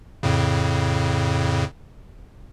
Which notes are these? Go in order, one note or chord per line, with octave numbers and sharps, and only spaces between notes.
F2 A2 C#3